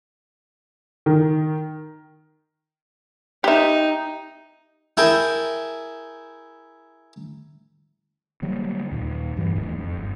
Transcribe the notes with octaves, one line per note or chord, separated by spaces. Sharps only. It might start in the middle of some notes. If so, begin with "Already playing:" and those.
D#3
D#4 G4 E5
E4 G#4 A#4 G5 A5
D3 F#3 G3 A#3
D#2 A#2
G2 E3 F#3
D#1 D2 G#2 E3
F2
G1